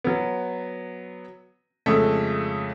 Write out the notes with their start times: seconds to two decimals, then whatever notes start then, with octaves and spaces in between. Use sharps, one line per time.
0.04 F#3 B3
1.86 F2 C#3 G#3 A3